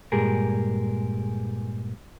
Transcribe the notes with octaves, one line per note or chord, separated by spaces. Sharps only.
G2 A#2 G#3 G4 G#4 A#4